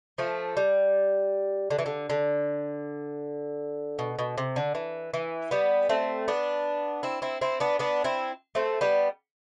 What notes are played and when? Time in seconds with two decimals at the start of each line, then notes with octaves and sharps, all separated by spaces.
0.18 F3 A3
0.57 G3
1.71 D3
1.79 E3
1.86 D3
2.10 D3
3.99 B2
4.19 B2
4.38 C3
4.56 D3
4.75 E3
5.14 E3
5.51 G3 B3
5.89 A3 C4
6.28 B3 D4
7.03 C4 E4
7.22 C4 E4
7.41 C4 E4
7.60 B3 D4
7.79 B3 D4
8.04 C4 E4
8.55 A3 C4
8.81 G3 B3